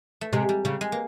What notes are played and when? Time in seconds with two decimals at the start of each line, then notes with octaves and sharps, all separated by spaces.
0.21 A3
0.33 C3 G#3
0.49 G3
0.65 C#3 G3
0.81 G#3
0.92 A#3